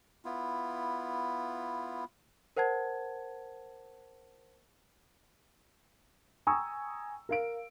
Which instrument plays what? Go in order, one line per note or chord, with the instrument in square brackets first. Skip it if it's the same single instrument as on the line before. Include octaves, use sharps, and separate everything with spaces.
[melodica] B3 E4 F4
[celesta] A#4 C5 F#5 A5 G#6
[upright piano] G5 G#5 A#5 C#6 D#6 E6
A#4 F5 D7